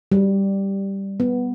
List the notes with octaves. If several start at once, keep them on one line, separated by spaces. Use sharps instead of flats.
G3
B3